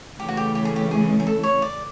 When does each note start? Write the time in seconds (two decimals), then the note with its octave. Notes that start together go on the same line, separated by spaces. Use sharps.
0.20 C#3 E3 A3 C#4 G4
0.28 F#4
0.37 G4
0.55 G4
0.65 G#4
0.76 G4
0.91 G#4
1.20 G#4
1.27 A4
1.43 C#5
1.62 D5